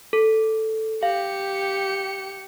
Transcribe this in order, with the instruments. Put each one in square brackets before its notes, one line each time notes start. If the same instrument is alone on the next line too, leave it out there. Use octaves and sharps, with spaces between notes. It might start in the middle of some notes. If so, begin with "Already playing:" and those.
[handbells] A4
[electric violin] G4 C#7 [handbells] F5